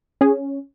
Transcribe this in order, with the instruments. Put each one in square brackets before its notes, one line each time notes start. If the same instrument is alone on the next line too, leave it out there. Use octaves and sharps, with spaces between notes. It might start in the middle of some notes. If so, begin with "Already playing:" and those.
[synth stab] C#4 G#4